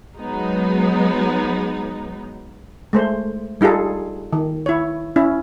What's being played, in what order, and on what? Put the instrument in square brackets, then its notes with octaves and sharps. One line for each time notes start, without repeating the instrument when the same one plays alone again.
[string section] F#3 G#3 B3 D#4
[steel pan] G#3 A3 C5
G3 D#4 F4 G#4 A4
D#3
E4 C#5
C#4 E4